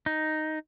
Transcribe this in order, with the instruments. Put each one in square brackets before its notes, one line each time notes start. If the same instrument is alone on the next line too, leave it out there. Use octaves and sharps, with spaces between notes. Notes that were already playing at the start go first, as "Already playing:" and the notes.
[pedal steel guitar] D#4